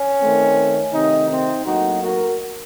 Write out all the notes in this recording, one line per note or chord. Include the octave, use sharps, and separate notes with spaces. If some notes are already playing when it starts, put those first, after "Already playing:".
Already playing: C#4
D#3 A3 C4
C3 D#3 A3 C4 D#4
C4 D#4
A2 F#3 A#3 D#4 F#4
F#4 A#4